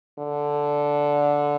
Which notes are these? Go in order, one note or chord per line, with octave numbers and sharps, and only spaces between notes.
D3